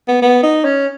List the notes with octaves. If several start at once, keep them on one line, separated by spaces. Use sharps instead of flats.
B3
B3
D#4
C#4